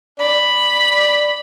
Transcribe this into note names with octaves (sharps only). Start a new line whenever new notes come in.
D5 B5